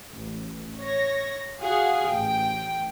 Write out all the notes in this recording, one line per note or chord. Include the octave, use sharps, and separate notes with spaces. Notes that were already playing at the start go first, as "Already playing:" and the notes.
A1
C#5 A#6
F#4 G#4 F5 F#5
A1 G5